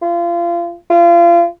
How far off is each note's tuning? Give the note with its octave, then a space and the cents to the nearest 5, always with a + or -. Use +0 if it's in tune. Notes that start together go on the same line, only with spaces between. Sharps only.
F4 -30
F4 -30